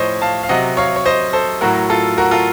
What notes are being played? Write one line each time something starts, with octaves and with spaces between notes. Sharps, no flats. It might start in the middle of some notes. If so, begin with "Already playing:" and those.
Already playing: A2 F3 C5 C#5 D#5
F5 A5
F5
C3 F#3 D#5 F#5
C#5 F5
C#5
C5 D#5
A4 C5
A2 F#3 F#4 A#4
F4 A4
F#4 A#4
F4 A4